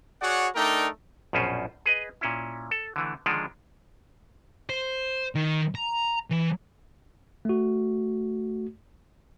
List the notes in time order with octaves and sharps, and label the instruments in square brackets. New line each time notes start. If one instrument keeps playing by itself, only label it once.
[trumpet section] F#4 G#4 C#5 D5 F#5
A3 D4 D#4 A#4 D5 G5
[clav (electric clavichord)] A#1 F#2 B2 C#4 F4 C5
G#4 B4 D#5
A#2 C#4 E4
A4
D3 E3 A3
D3 D#3 F3 G#3 D4 F#5
[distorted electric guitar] C5
D#3
A#5
E3
[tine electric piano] A3 F#4